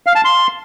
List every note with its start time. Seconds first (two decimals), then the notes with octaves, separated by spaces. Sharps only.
0.06 F5
0.15 A5
0.24 C6